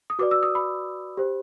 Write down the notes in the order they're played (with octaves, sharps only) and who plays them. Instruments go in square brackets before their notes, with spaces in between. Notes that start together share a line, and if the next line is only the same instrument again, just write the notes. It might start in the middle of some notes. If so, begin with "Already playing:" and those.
[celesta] D#6
F#4 B4 D5 D6
E6
D#6
B5
G4 C5